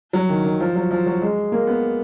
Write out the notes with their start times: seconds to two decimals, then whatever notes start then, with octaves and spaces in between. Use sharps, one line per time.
0.13 F#3
0.29 D#3
0.44 D#3
0.60 F3
0.76 F#3
0.91 F3
1.06 F#3
1.22 G#3
1.52 A#3
1.67 B3